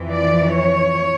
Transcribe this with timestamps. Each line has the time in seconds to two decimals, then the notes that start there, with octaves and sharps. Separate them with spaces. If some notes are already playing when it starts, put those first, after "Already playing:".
Already playing: F2 E3
0.12 D5
0.54 C#5